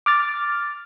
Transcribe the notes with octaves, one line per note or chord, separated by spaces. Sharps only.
D6 F6 A6